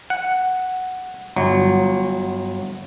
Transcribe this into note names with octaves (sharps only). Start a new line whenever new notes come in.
F#5
G1 F#3